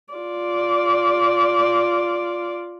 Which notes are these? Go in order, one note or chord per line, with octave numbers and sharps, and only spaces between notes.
F4 D5